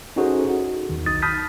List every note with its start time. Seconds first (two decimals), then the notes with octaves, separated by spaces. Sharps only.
0.16 C#4 D#4 F#4 G#4 A4 C5
0.49 D#4 F#4
0.89 E2 D#3
1.06 B1 D#4 D#6 A6
1.22 A5 B5 D#6 F6 G6 B6